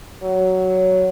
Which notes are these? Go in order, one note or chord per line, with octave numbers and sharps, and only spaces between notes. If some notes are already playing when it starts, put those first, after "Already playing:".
F#3